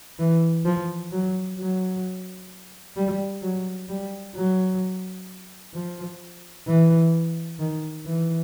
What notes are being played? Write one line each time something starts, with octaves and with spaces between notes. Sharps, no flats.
E3
F3
F#3
F#3
G3
F#3
G3
F#3
F3
E3
D#3
E3